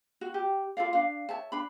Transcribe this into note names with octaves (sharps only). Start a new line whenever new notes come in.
F#4
G4
F4 A4 D5 F5
D4 F5
C#5 E5 A5
D4 B5